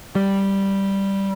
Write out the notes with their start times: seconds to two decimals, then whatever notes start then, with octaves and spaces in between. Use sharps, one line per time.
0.15 G3